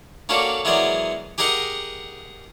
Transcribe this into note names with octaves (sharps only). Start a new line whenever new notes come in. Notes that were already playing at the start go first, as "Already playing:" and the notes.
A#3 C#4 D4 F#4 A4
E3 F#3 G#3 B3 A#4 D5
G4 G#4 A#4 D#5 F#5